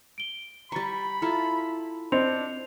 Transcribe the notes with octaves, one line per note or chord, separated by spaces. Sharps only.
D7 G7
G3 A#5 B5 C#6 A6
E4 F4 A4 A#5
C4 D4 D#5 C#7 F7